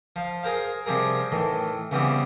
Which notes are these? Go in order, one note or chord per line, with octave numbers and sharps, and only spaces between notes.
F3 F5
G#4 A#4 C5 F5
C3 F3 G3 G#4 A#4
A2 D#3 E3
C#3 E3 G3 B3 C4